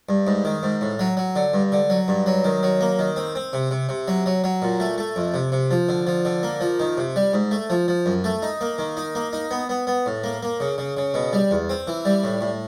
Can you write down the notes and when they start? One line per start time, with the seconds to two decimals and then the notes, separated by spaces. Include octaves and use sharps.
0.09 G2
0.27 G#2
0.45 D#3
0.63 G#2
0.81 A2
0.99 F#3
1.17 F#3
1.36 D3
1.54 G2
1.72 D3
1.90 F#3
2.08 G2
2.26 F#3
2.44 D#3
2.63 F#3
2.81 A#3
2.99 D#3
3.16 C4
3.35 C4
3.53 C3
3.71 C3
3.89 C3
4.08 F#3
4.26 F#3
4.44 F#3
4.62 A#2
4.80 A3
4.98 A3
5.16 F2
5.34 C3
5.52 C3
5.71 F3
5.89 D3
6.07 F3
6.25 D3
6.43 A#3
6.61 F3
6.80 D#3
6.97 C3
7.16 G3
7.33 G#2
7.51 A3
7.70 F3
7.88 F3
8.06 F#2
8.24 A3
8.42 D#4
8.61 A#3
8.78 D#3
8.97 D#4
9.15 A#3
9.33 D#4
9.51 B3
9.69 B3
9.87 B3
10.06 A2
10.24 A#3
10.43 A#3
10.60 C#3
10.78 C#3
10.97 C#3
11.14 B2
11.33 G3
11.51 E2
11.69 C4
11.87 E3
12.05 G3
12.23 A2
12.41 A2